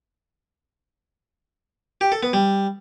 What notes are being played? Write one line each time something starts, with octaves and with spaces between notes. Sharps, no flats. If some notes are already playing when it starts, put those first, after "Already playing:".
G4
A4
B3
G3